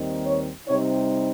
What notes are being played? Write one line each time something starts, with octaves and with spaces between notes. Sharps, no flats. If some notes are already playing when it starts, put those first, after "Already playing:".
Already playing: D#2 D#3 G3 C4 D#4
C#5
C3 G3 C4 D#4 C#5